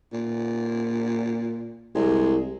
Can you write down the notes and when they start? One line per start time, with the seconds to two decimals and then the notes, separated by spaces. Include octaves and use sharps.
0.13 A#2
1.95 C2 G#3